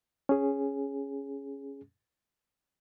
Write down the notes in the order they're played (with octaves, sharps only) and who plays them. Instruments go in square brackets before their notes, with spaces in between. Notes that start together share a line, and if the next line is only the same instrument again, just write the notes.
[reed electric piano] C#4 G#4